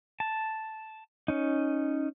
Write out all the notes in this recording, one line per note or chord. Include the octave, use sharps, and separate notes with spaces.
A5
C#4 D#4